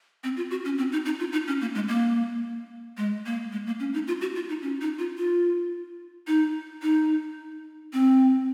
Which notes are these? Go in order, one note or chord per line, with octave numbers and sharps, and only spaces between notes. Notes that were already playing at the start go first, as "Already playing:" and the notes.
C4
F4
F#4
C#4
C4
D#4
D#4
F4
D#4
C#4
A#3
G#3
A#3
G#3
A#3
G#3
A#3
C#4
D#4
F4
F#4
F4
D#4
C#4
D#4
F4
F4
D#4
D#4
C4